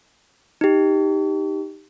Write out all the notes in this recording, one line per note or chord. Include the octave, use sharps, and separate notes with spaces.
D#4 G4